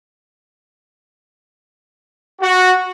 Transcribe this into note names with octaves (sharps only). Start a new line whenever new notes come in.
F#4